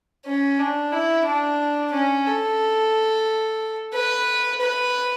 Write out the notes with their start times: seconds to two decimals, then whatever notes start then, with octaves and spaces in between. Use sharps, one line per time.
0.26 C#4
0.59 D4
0.92 E4
1.25 D4
1.92 C#4
2.26 A4
3.93 B4
4.60 B4